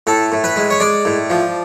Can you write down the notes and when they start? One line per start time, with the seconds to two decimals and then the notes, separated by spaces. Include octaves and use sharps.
0.07 A2 A4
0.32 A2
0.44 B4
0.56 G#3
0.70 C#5
0.80 G#3 D5
1.05 A2
1.30 F3